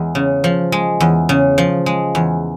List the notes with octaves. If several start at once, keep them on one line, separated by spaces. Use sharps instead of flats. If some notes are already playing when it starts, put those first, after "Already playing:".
Already playing: E2 G#3
C#3
F3
G#3
E2
C#3
F3
G#3
E2